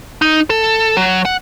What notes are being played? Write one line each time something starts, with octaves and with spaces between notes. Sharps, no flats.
D#4
A4
F#3
F#5